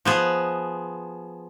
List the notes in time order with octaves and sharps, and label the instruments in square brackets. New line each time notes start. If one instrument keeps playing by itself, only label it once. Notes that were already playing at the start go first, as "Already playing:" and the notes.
[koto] F3 B3 G#4